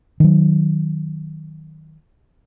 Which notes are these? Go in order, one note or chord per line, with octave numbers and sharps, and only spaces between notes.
D#3 F#3